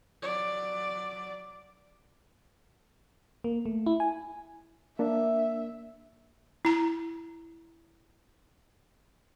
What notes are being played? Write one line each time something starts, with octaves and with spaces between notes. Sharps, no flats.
F#3 D5
A#3
A3
E4
G#5
A#3 D4 E5
E4 A#5